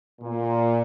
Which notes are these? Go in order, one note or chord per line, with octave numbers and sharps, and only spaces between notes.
A#2